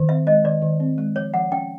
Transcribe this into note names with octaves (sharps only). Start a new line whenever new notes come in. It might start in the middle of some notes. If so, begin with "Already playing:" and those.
Already playing: D#3
C4 E5
G#3 D#5
D#3 D5
D#3
C4
G#3
F3 C#5
F3 F#5
C#4 G5